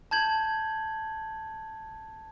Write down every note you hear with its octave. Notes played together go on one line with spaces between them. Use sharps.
A5 G6 G#6 F#7